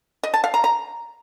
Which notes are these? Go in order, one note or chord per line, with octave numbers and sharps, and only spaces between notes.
D#5
A5
F5
A#5
A#5